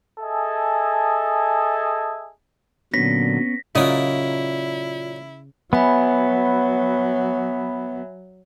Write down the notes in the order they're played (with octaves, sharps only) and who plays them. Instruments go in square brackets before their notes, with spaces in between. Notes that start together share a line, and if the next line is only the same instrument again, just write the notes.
[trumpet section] G#4 A4 D#5 E5 G#5 A5
[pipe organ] A#2 D3 F#3 [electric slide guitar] B3 C#4 [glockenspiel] A#6 B6
[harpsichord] A#2 F#3 A#4 [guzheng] C#3 [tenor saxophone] E4 [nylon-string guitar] F4 D#5
[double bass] F#3 [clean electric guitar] B3 [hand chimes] E5 G#5 B5